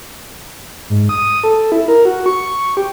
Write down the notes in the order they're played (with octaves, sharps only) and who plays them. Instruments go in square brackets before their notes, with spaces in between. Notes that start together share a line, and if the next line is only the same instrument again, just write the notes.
[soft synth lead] G#2
D#6
A4
E4
A#4
F#4
C#6
G4